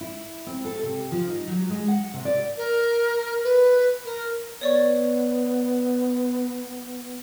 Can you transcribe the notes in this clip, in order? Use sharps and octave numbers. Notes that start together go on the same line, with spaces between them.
E4
C4
A4
C3
F3
D#4
F#3
G#3
F#5
C3
D5
A#4
B4
A#4
B3 C#5 D5 C#6